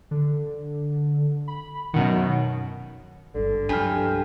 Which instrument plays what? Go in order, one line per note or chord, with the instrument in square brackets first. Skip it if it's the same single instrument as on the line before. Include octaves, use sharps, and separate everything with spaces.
[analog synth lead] D3
B5
[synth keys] F#2 B2 D#3 [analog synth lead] F#5
[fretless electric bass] G#1 G2 [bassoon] D3
[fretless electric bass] C2 F3 F#3 [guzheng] G2 [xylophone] G#5 F6